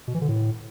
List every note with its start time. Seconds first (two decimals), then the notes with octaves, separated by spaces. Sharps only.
0.08 B2
0.15 E3
0.21 D3
0.28 A2